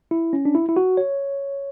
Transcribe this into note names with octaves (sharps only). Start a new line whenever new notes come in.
E4
C#4
D4
E4
E4
F#4
C#5